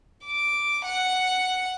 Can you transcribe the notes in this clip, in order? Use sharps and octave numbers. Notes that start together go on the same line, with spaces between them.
D6
F#5